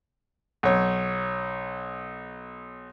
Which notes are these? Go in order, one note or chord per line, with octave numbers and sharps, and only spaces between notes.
B1 C#5